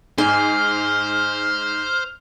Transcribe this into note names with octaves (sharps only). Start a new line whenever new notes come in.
G#2 C5 G#5 F6